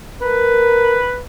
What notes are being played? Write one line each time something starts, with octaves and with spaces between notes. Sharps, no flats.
A#4 B4